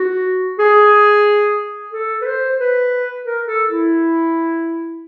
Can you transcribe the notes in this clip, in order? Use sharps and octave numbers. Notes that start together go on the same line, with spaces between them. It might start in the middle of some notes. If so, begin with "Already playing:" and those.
Already playing: F#4
G#4
A4
B4
C5
B4
A#4
A4
E4